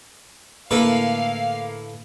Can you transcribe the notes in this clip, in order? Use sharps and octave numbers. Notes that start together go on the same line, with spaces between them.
A2 D3 A3 A#3 E4 A4 B4 F5